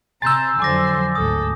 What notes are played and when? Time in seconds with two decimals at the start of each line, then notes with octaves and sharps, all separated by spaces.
0.22 C3 G#5 A#5 C6 E6 G6 A6
0.60 F2 D3 F#3 C5 G#5 C6 D6 A#6
1.15 G#1 D2 A4 D#6